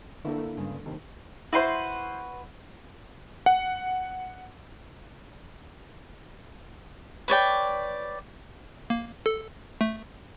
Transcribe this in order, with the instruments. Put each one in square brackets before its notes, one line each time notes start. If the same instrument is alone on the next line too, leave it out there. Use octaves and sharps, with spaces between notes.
[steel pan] D3 A#3 A4 [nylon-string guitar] E4
[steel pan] A#3
[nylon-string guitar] G2 C#3 G#3
[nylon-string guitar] D#2 C3 [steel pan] D#3
[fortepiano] E4 C5 [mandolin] F#4 B4 C6
[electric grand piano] F#5
[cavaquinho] B4 C#5 D5 G5
[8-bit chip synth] A#3
A4
A3